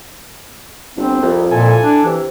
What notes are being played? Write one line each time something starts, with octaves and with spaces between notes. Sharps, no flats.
G1 C4
C2 F2
A#2 E4 A4 G#5
D4
C3 E3